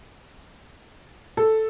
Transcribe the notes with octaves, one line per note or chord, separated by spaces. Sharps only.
A4